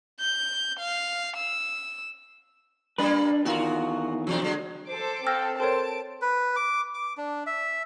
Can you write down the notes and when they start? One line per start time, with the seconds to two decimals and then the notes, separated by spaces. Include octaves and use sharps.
0.20 G6
0.79 F5
1.37 E6
2.98 G3 A#3 D4 B4
3.45 E2 D#3 F4 F#4 A#4
4.27 E2 C3 F#3 D4
4.42 D3 G#3
4.88 A4 C5 D6
5.27 C4 A4 G5 E6 F6 A#6
5.60 A4 A#4 C5 C#5 A5 D7
6.22 B4
6.56 D6
6.94 D6
7.17 D4
7.46 E5